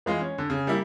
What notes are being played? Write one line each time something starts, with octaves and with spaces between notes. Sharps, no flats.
E3 G#3 F4
C#4
D3
C#3
G3 A#3 E4